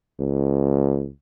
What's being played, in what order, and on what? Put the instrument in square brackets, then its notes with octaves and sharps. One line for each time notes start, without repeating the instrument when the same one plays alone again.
[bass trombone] C#2